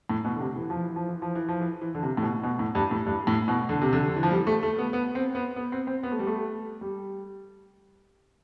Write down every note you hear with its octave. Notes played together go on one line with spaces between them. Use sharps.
A2
B2
D3
C3
E3
F3
E3
F3
E3
F3
E3
F3
E3
E3
D3
C3
A2
B2
B2
A2
G2
A2
G2
A2
B2
D3
C3
D3
D3
E3
F3
G3
A3
A3
B3
B3
C4
B3
B3
C4
C4
B3
A3
G3
A3
G3